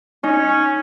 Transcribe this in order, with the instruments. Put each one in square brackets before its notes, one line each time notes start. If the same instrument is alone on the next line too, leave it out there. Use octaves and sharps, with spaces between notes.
[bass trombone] C#4 [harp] D#4